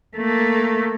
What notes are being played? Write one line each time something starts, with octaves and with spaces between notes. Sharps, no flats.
A3 A#3